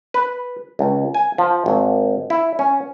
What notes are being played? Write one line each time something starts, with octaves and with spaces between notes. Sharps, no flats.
B4
C#2
G#5
F3
G#1
E4
C#4